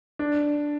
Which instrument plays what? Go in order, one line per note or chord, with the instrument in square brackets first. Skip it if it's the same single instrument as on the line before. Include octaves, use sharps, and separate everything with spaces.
[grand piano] D4